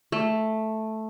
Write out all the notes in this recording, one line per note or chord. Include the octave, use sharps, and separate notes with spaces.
A3